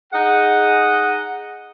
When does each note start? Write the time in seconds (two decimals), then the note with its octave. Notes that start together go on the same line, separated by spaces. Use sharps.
0.13 D#4 G#4 D#5 F#5